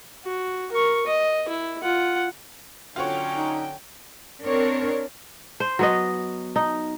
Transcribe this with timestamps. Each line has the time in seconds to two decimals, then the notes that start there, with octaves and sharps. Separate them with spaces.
0.24 F#4
0.72 A#4 C#6
1.07 D#5
1.48 E4
1.83 F4 F#5
2.96 D3 F#3 C#4 F4 F#4 C#5 G5
3.36 D#4
4.45 C4 D4 A#4 C#5
5.60 C5
5.79 F#3 B3 D#5
6.56 D#4